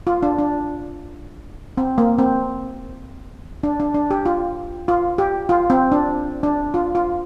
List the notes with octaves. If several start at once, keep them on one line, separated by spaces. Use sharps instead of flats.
F4
D4
D4
C4
A#3
C4
D4
D4
D4
G4
F4
F4
G4
F4
C4
D4
D4
F4
F4